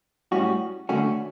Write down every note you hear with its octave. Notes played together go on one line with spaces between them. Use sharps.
A2 G3 C#4 F#4
D3 A3 C#4 F#4